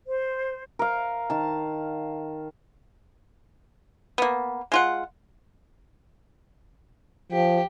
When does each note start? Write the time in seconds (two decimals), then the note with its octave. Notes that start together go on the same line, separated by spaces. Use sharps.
0.07 C5
0.79 A#4 F5
1.30 D#3 A5
4.18 A#3 B3
4.72 G#3 F4 F#5
7.32 F3 G4